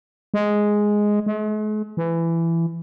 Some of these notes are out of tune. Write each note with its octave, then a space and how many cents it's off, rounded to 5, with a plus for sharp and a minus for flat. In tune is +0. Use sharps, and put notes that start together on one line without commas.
G#3 +0
G#3 +45
E3 +15